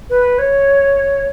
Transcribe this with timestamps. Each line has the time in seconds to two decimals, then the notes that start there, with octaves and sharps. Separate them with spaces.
0.10 B4
0.39 C#5